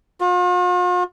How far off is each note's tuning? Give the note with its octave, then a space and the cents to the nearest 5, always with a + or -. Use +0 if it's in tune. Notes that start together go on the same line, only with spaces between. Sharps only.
F4 +45